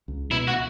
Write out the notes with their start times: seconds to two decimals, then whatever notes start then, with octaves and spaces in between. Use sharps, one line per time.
0.08 C#2
0.31 B2 E4
0.47 F#4